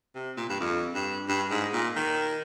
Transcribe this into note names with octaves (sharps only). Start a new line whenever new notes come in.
C3
A#2
G2
F2
G2
G2
G#2
A#2
D#3